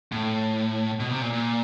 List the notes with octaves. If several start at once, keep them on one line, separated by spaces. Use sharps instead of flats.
A2
B2
C3
A#2
A#2